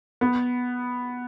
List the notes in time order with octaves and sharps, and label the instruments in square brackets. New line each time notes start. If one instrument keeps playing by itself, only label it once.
[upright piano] B3